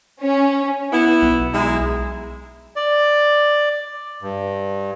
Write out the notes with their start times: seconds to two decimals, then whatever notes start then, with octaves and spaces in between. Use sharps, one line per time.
0.21 C#4
0.93 B3 E4
1.22 B1
1.53 G#3 D#4 E4
2.76 D5
4.22 G2